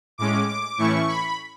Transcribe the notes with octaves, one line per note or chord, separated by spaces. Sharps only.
A2 G#3 C#4 D6
D6
A2 E3 A3 C#4 E4 C#6
B5